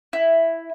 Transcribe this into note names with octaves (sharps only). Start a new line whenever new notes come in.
E4